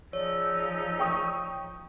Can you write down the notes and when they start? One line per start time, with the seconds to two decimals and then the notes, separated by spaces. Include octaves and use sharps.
0.13 F3 D#4 G#4 C#5 D5 E6
0.99 G5 C#6 D#6